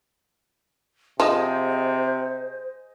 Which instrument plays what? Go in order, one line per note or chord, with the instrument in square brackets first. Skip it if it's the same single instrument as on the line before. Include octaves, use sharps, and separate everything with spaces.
[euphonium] C3 [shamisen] F3 F4 [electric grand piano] G#4 D#5 [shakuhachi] C5